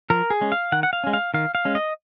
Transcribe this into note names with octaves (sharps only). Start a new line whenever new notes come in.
F3 A#4
G#4
G#3 C#4
F5
D#3 F#5
F#5
F5
G#3 C#4
F5
D#3 F5
F5
G#3 C#4
D#5